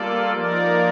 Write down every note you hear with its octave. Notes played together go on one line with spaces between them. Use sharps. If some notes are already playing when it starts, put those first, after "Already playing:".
Already playing: G3 A#3 F4 A4 D5
F3 A#3 D#4 A#4 D5